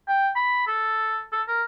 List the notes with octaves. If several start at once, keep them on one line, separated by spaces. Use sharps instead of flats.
G5
B5
A4
A4
A#4